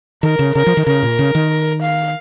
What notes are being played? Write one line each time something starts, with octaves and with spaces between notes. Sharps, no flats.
D#3 A#4
C#3
C#3 A#4
F3
D#3
C#3 A#4
A#2
C#3
D#3
F5